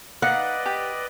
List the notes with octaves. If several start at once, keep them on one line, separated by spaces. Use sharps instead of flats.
D#4 B4 D5 D#5 F5 F#5
G4